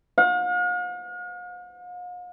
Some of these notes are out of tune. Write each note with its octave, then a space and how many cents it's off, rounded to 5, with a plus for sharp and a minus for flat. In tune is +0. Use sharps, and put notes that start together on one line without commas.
F5 +45